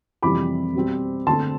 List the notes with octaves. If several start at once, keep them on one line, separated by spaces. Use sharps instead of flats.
F2 C3 E3 G3 B5 D6
B2 G3 C4
D3 A3 C4 A5 C6